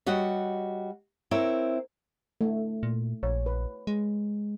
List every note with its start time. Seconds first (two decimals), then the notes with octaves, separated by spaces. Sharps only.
0.06 G3 F#4 C#5 D#5 F#5
1.31 C4 E4 A#4 C#5
2.41 A3
2.83 A#2
3.23 A#1 C#5
3.46 B4
3.87 G#3